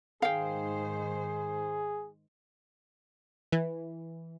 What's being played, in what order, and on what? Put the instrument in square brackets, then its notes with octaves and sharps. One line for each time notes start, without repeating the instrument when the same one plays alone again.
[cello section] G#2 D#3 C5 [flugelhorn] G#4 [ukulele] F5 G5
[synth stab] E3